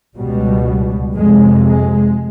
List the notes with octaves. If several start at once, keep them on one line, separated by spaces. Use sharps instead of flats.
C#2 B2 G3
F2 C3 G#3
G#3